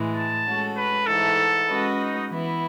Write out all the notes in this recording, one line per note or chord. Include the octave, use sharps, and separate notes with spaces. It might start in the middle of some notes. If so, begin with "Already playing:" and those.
Already playing: A2 E3 G#3
A5
G#3 C#4 F#4 A4
B4
G#2 E3 A3 A4
G#3 C#4 F#4 B4 D#5
D#4
E3 B3 E4